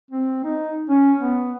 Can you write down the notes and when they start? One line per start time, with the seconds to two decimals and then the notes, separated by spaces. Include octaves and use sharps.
0.11 C4
0.44 D#4
0.89 C#4
1.18 B3